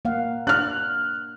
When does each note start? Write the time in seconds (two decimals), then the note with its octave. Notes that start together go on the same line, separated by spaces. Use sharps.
0.05 A#3 F5 F#5
0.47 D4 F6 F#6